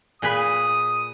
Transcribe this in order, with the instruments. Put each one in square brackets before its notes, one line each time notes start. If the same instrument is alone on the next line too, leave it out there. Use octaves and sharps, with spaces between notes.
[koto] A#2 G#4 B4 [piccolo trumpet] D#6